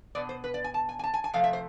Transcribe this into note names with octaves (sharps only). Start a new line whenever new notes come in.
B2 B3 D5
C5
B4
D5
G#5
A5
G#5
G#5
A5
G#5
G#5
C3 F3 A3 C4 F5
E5
C5